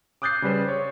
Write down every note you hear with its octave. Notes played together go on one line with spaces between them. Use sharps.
D6 D#6 F#6 G6 A6 C7
C#3 G3 B4 C5
C#5